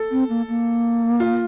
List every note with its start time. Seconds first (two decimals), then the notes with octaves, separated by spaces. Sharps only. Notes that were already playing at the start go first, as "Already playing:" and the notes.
Already playing: A4
0.11 C4
0.29 A#3
0.48 A#3
1.20 F4